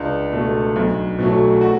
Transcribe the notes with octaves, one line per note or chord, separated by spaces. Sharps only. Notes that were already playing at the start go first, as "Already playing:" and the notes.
Already playing: C#2 D4
B2 A3
B1
B2 F#3 A3
F#4